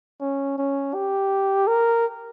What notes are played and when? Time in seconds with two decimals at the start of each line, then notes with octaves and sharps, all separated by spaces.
0.21 C#4
0.59 C#4
0.94 G4
1.67 A#4